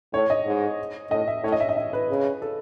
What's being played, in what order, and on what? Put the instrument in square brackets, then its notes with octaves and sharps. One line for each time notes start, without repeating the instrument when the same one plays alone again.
[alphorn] A2 [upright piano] C#5
[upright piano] D#5
[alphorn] G#2
[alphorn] A2 [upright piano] D#5
[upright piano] E5
[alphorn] A2 [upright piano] C#5
[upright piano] D#5
E5
D#5
E5
B4
[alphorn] C#3
[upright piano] A4